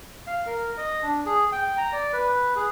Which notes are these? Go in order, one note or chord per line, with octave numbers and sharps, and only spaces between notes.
F5
A#4
D#5
D4
G#4
G5
A#5
D5
B4
G#4